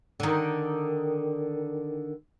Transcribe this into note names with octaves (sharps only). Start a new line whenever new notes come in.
D3 D#3